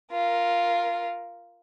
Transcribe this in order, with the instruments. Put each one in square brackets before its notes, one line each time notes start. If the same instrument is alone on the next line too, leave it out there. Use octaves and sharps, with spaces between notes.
[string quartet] F4 A#4